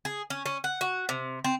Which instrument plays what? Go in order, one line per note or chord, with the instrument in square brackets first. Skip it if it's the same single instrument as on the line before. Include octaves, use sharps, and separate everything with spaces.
[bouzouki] G#4
C#4
C#4
F#5
F#4
C3
C4